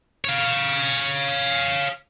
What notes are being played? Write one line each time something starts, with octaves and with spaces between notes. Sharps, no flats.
C#5 F5